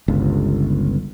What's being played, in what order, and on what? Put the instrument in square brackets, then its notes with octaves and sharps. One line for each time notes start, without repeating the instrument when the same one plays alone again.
[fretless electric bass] G1 C#2